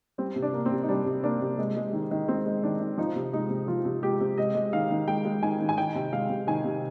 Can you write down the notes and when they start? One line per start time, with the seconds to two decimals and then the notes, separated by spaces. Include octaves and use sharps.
0.18 G3 C4
0.36 C3
0.42 D4
0.53 A#3
0.66 C4
0.71 C3
0.83 D#4
0.89 G3 D4
1.06 C3
1.24 A#3 D4
1.41 C3
1.58 G#3
1.76 G#3
1.93 D#3
2.11 D#3
2.28 G#3 C4
2.46 G#3
2.64 D#3 D4
2.81 D#3
2.98 F3 D#4
3.16 C3
3.33 G#3 D#4
3.50 C3
3.68 F3 F4
3.85 C3
4.03 G#3 G4
4.21 C3
4.38 G#3 D#5
4.55 G#3
4.73 D#3 F5
4.90 D#3
5.07 G#3 G5
5.25 G#3
5.42 D#3 G#5
5.60 D#3
5.69 G#5
5.78 D#3 G5
5.95 C3
6.12 G#3 F5
6.29 C3
6.47 D#3 G#5
6.65 C3